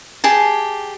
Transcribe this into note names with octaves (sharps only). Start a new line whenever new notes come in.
G4 G#4 A5